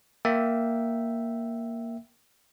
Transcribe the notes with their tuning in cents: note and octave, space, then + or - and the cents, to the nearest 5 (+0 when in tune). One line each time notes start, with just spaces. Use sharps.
A#3 +0 E5 +0 G5 -15